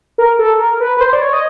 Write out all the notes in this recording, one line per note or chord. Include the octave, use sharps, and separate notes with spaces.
A#4
A4
A#4
B4
B4
C5
D5
C#5
D#5